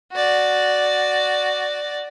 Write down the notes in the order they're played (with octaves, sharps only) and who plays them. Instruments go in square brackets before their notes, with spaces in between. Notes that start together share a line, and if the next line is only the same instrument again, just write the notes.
[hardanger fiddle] F#4 D5